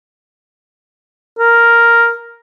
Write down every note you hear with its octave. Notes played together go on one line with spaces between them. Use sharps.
A#4